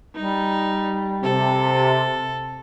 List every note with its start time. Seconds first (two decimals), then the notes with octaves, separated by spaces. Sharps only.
0.15 G3 D#4
1.23 C3 A4